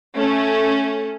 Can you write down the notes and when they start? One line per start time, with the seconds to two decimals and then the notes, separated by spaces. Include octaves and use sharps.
0.15 A3 C#4